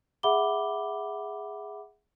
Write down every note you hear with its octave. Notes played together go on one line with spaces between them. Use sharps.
G#4 E5 F#5 B5 D6 G7